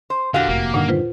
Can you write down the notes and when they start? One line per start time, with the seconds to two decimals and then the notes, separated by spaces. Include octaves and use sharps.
0.10 C5
0.34 E2 A#2 D3 F#4 G4 F5
0.49 F1 A#3
0.74 G2 A#2 D3 D#3 F#5 D#6
0.88 F4 B4 C5